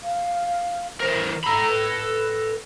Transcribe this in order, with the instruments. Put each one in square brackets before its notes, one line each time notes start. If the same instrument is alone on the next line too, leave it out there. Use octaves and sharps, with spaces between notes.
[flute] F5
[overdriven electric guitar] E3 A#4 [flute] C5
[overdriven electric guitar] A4 B5 [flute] A#5
[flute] B4